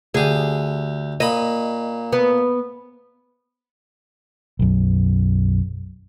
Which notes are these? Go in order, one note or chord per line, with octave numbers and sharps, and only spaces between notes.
D2 G4 G#4
A#2 D#5 B5
B3
B1 F#2